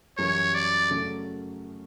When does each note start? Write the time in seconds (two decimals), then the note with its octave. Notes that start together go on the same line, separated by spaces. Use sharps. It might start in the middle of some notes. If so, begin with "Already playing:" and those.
0.18 F#2 E3 G3 C#4 F#4 C#5
0.54 D5
0.90 C#3 F#3 A3 C#4